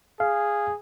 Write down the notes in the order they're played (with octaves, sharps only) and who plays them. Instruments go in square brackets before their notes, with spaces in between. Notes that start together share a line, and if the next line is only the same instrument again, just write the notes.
[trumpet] G#4 [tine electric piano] F5